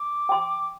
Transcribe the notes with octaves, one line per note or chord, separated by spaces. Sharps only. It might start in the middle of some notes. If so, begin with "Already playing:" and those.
Already playing: D6
G5 C6